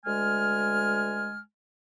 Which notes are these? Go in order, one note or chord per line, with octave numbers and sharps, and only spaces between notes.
D2 G#3 G#5 F6